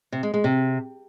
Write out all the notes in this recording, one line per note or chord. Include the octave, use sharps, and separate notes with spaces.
C3
G#3
G#3
C3